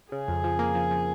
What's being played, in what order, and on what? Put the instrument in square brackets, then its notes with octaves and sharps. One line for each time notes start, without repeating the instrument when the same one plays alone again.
[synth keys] C#3 [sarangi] G#4
[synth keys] F2
F3
A#3
F3
F3